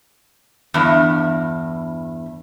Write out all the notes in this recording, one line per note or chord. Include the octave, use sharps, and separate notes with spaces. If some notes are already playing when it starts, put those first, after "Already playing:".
E2 G2